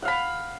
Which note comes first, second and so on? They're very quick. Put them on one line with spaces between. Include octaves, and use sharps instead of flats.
F#5 F5 B5